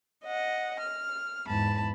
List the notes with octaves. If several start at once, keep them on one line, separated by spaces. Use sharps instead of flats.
D#5 F#5
F6
E2 G#2 A5 B5